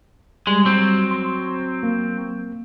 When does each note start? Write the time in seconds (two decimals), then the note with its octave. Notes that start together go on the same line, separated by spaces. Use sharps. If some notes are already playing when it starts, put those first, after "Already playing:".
0.47 G3 G#3
0.65 F#3 C4
1.11 C6
1.83 A#3